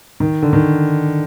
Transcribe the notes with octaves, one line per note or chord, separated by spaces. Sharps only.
D#3
D3
D#3